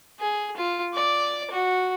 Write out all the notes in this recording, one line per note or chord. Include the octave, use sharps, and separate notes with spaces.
G#4
F4
D5 D6
F#4